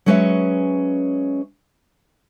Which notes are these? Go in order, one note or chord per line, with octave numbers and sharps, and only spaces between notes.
F#3 G#3 C#4 B4 C#5 E5